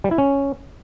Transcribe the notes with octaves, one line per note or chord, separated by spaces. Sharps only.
G3
E4
C#4